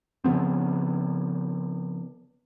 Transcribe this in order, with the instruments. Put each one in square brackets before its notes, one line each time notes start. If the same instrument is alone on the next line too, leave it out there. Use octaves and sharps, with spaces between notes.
[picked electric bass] C#3 F3 B3 C4